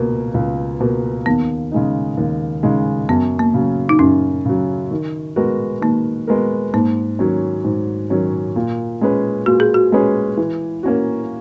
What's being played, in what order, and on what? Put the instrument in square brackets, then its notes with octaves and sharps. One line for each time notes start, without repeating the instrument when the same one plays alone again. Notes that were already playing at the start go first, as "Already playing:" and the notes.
Already playing: [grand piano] C#2 B2 A#3
C#2
B2 A#3
[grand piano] D#2 [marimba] B3
[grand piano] C#3 G#3 D#4
D#2
C#3 G#3 D#4
[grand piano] F#2 [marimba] B3
[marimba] A#3
[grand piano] C#3 F#3
[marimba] D#4
[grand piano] F#2 [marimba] C#4
[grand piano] C#3 F#3
D#3
G#3 B3 F#4 A#4
[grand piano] D#3 [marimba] A#3
[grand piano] G#3 B3 F#4 A#4
[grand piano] G#2 [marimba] A#3
[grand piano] D#3 F#3 C#4
G#2
D#3 F#3 C#4
A#2
G#3 C#4 G#4 B4
[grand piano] A#2 [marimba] F#4
[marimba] G#4
F#4
[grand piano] G#3 C#4 G#4 B4
E3
A#3 C#4 F#4